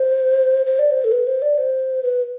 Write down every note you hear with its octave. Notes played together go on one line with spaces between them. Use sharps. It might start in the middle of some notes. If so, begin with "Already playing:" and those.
Already playing: C5
C5
D5
C5
A4
B4
C5
D5
C5
B4